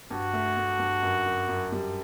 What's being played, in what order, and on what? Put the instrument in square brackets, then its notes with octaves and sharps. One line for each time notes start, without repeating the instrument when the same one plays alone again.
[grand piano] G2 [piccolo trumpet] F#4
[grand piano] A3
A3
G2
F#2
F#2
F#2
G3